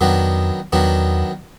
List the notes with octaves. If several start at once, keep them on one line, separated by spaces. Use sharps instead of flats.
F2 D#3 F#3 B3 D4
E2 D#3 F#3 B3 D4